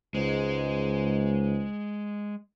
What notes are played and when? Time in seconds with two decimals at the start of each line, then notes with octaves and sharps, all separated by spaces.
0.15 C#2 G#2 G#3